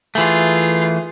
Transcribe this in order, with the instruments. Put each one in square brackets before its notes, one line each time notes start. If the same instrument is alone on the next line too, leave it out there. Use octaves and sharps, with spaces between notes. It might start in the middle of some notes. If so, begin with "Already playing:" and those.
[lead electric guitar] E3 A3 [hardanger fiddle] F4 G#4